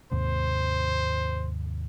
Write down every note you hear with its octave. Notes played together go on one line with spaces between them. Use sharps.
D#2 G#2 C3 C5